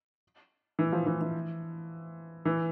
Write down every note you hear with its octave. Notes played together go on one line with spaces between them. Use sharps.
E3
F3
E3
E3
E3